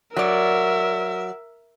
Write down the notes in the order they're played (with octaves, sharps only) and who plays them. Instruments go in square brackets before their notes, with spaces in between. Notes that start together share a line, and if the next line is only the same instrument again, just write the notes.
[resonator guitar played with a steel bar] F#3 D5 [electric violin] A#4 E5